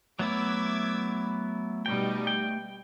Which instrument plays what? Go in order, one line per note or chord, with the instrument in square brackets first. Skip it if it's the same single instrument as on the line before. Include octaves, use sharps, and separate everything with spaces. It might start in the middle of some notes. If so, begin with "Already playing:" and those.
[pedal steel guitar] F#3 B3 E4 [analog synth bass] A3 [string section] D6 E6 G#6
[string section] B2 G3 D#4 [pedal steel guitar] G5
[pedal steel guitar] G5